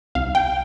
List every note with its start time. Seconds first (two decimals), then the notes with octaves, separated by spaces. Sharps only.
0.15 C2 F5
0.35 G5